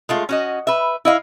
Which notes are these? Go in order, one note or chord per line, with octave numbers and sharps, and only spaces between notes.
G#3 A3 F4
C#4 F#4 D#5
B4 E5
E4 D#5 F5